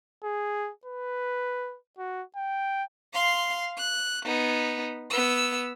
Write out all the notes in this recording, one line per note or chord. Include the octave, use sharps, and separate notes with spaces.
G#4
B4
F#4
G5
F5 C6
F#6
B3 D#4
B3 E6